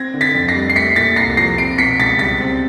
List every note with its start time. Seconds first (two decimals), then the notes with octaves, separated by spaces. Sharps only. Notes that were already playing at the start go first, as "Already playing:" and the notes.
Already playing: C4 G#6 A#6
0.14 D3
0.21 A6 B6
0.35 F2
0.48 A#6 C7
0.55 G3
0.70 C7
0.75 A3 B6 C#7
0.96 A#2 A6 B6
1.16 C2 A#6 C7
1.37 F3 A#6 C7
1.58 C4 C7 D7
1.78 B2 B6 C#7
1.99 C#2 A6 B6
2.19 G3 A6 B6
2.41 C4